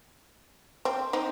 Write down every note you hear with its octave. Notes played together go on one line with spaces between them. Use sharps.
C4
C4 D#4